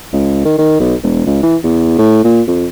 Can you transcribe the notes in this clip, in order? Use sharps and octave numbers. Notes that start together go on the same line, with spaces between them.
C#2
D#3
D#3
B1
E1
C#2
E3
E2
A2
A#2
F2